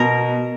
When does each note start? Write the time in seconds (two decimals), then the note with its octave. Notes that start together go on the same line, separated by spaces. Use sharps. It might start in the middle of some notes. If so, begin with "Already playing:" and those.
Already playing: B2 A#4